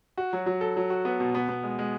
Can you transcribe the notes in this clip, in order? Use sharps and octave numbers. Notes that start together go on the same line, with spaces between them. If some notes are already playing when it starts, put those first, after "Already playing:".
F#4
F#3
F#3
A4
F#3
F#4
B3
B2
B3
B3
G#3
G#3